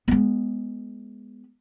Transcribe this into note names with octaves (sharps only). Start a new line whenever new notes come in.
G#3 B3